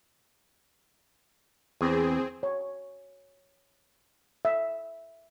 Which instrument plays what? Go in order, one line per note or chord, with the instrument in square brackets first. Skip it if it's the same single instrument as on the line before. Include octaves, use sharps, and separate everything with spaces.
[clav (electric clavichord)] E2 [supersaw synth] C4 G#4
[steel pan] C#5
E5